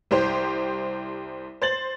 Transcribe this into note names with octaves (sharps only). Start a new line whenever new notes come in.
C2 G4 C5
C5 A6 F#7